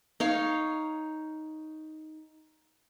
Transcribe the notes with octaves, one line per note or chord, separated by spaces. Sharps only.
D#4 C#5 F5